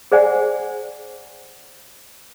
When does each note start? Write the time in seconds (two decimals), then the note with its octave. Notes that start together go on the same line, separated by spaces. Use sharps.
0.12 G#4 C5 D5 F#5 G#5